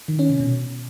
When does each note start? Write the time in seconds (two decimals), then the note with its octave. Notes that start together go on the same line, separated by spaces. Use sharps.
0.08 D#3
0.19 C#4
0.30 C3
0.40 B2